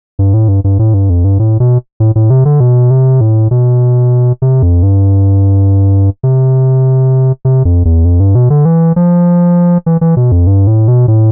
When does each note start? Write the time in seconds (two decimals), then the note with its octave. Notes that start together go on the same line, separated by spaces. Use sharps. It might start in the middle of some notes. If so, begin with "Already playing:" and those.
0.19 G2
0.34 A2
0.48 G2
0.64 G2
0.79 A2
0.94 G2
1.10 F2
1.24 G2
1.39 A2
1.60 B2
2.00 A2
2.15 A2
2.30 C3
2.45 D3
2.60 B2
2.91 C3
3.21 A2
3.51 B2
4.42 C3
4.63 F2
4.83 G2
6.23 C3
7.45 C3
7.65 F2
7.85 E2
8.05 F2
8.20 G2
8.35 B2
8.50 D3
8.65 E3
8.96 F3
9.86 E3
10.01 E3
10.17 B2
10.32 F2
10.47 G2
10.67 A2
10.88 B2
11.08 A2